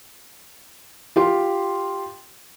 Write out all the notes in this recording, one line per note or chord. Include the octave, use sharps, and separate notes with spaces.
F4 G4 C6